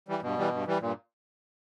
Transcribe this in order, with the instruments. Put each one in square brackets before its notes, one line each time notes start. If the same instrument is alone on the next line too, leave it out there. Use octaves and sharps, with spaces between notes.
[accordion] E3 G3
[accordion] G2 [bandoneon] B2
[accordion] E3 G3
G2
E3 G3
[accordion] G2 [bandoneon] A#2